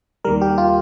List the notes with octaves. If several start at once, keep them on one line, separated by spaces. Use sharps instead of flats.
D#2 D#3 G3 A#4
G4
F4